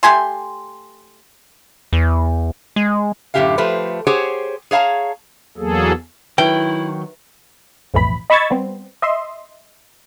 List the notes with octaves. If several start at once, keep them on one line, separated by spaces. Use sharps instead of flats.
A3 G4 G#5 C6
E2
G#3
F#2 A2 D3 G4 E5 F5
F3 A3 G4 B4 C5
G4 G#4 C5 C#5 F#5
G#4 C#5 F5 A5 A#5
E2 F#3 A#3 G#4 A4
D#3 F#3 E4 B4 E5 G5
B1 F2 A2 E3 B5
D#5 B5 C#6 E6 G#6 A6
G3 B3 C4
D#5 E5 C6